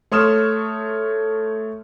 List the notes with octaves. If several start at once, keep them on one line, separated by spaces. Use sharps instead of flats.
A3 C#5 C6 D#6 F6 E7